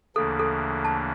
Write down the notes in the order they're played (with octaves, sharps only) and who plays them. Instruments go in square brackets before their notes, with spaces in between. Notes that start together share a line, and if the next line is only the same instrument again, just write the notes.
[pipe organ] D2 C#3 E3 A#3 D4 [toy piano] A4
[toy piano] A4
A5